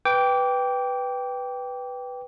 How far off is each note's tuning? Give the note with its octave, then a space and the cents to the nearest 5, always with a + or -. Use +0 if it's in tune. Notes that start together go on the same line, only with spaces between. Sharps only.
B4 +0 G5 +0 D6 -25